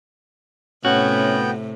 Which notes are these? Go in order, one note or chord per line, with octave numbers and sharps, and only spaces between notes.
A2 C3 B3 C#4 F#4 G5